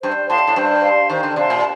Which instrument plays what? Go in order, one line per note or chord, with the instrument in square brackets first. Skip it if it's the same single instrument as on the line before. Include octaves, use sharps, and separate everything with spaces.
[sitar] G2 [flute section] C5
[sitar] A2 [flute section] F5 A5 C6
[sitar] A2
[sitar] G2 [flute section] C5
[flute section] F5 A5 C6
[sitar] D#3 [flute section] C5
[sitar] D3
[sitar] C3 [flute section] F5 A5 C6
[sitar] A#2